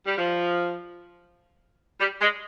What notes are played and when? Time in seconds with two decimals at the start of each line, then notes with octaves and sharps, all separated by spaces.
0.06 G3
0.18 F3
2.00 G3
2.21 G#3